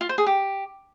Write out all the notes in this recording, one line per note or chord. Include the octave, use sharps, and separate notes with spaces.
F4
C5
G#4
G4